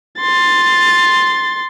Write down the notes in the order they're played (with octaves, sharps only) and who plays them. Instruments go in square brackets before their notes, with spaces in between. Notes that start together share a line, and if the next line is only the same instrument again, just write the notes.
[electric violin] C6 A6